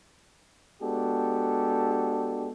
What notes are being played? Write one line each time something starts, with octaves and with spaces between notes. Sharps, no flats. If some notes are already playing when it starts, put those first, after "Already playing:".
G#3 B3 D4 F#4 G4 A4